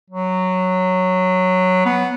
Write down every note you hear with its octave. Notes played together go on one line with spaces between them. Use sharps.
F#3
B3